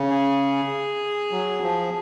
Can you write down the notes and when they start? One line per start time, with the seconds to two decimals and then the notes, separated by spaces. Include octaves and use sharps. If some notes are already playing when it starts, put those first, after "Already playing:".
Already playing: C#3
0.10 G#4
1.32 F#3
1.62 F3